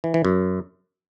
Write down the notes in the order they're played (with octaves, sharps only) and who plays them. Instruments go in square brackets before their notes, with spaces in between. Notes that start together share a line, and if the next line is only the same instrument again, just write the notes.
[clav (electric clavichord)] E3
E3
F#2